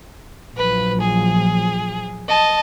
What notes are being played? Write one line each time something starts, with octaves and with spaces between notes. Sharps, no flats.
A#1 F3 F#3 B4
G#4
D#5 A5